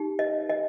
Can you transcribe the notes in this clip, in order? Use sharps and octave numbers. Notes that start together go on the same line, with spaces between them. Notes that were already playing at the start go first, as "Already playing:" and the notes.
Already playing: D#4 G4
D#5
D#5